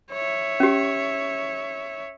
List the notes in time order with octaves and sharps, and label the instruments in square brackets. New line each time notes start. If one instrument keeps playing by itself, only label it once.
[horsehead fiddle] C#5 E5
[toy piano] C#4 G4